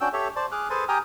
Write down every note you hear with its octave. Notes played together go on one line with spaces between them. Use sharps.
C#4 D4 F#4 G5 E6
G4 A4 C#5 E5
C5 D5 A5
G#4 D6 F6 F#6
G#4 A4 B4 C5 G#5 A5
G4 G5 G#5 A#5 D#6 F6